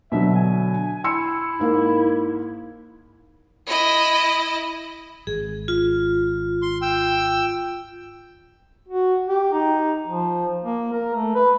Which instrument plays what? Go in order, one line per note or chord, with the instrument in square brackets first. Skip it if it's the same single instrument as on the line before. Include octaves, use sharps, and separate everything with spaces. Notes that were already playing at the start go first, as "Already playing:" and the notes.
[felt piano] B2 D3 F#3 [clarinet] E5
[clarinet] G#5
[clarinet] E4 [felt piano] C6 E6 C#7
[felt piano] G#2 A#3
[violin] E4 D#5
[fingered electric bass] G#1 [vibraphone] G#4
[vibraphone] F4
[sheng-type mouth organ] C6
G5 E6
[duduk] F#4
G4
D#4
F3
A#3
A#4
A3
B4